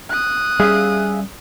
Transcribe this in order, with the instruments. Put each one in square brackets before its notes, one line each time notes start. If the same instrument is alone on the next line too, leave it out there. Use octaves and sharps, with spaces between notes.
[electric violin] D#6 F#6
[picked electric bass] G3 C#4 [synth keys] G#4 E5 F5